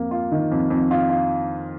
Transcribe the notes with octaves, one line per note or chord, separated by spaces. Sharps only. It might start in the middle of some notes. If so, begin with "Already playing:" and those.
Already playing: F2 A#3
F4
D#3
F2
F2
F4
F4